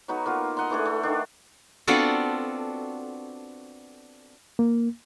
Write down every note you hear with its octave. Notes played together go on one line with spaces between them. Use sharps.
F#3 B3 D#4 F#4
A#3 B3 F4
D#5 F#5 A#5 C6
E3 A3 D4 G#4
A3
D#3 D4
B3 C4 D4 F4 F#4 A4
A#3